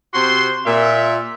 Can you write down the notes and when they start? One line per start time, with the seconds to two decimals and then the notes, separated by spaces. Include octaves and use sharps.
0.14 C3 F#4 C5 C6
0.66 A#2 E5